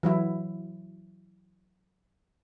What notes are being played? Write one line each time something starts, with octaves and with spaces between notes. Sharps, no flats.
E3 F#3 E4